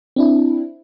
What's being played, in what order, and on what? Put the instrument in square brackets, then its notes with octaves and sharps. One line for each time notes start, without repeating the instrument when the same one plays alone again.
[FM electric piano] C4 D4 E4